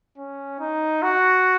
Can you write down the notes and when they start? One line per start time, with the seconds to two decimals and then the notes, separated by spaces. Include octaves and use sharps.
0.17 C#4
0.59 D#4
1.02 F#4